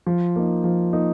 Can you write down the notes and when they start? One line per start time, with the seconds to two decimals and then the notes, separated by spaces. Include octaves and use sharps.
0.07 F3
0.36 A#3 D#4
0.64 F3
0.93 A#3 D#4